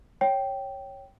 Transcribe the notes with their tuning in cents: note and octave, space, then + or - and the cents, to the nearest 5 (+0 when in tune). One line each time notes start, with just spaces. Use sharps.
C#5 -10 G5 -10